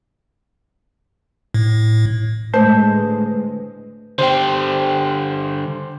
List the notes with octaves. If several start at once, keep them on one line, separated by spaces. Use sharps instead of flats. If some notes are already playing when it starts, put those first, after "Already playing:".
A2
A2 D3 G#3 A3 B4 C5
D3 G3 C5 G5